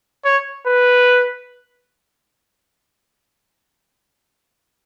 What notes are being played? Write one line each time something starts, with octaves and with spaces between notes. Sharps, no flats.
C#5
B4